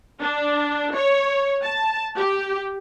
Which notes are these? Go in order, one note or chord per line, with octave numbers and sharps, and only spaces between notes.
D4
C#5
A5
G4